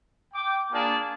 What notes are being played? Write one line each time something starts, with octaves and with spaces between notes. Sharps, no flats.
G5 D6
A#3 D4 F4 G#4 D5 A5